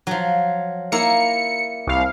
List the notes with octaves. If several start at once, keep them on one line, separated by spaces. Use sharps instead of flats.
F3 F#3
A#3 E4 A#5 C#7
C2 F5